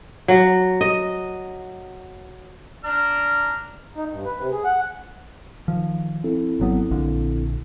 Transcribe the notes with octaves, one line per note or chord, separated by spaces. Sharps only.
F#3
D#5
D4 A#5 F6
D#4
G2
B4
C3
G#4
F#5
D#3 F3
C4 E4 A4
G#1 F#3 B3
A#1 A#2 D3